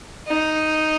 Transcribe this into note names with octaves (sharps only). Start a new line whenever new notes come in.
D#4